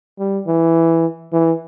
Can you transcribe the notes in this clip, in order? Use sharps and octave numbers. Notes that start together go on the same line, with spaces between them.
G3
E3
E3